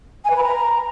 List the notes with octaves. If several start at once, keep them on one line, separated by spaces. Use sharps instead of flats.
G#5
B4
B5
A#5